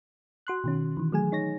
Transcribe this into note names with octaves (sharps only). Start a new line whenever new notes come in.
F#4 C6 F#6
B2 D#3 C#4
D#3 E3
F#3 A3 G#4 G#5
D#4 C#5 A#6